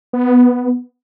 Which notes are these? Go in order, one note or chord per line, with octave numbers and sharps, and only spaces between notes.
B3